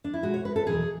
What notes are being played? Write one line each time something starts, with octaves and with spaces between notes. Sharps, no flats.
D4
E4
B2 G#3 F#4
C#5
B4
A4
E2 B2 F#3 G#4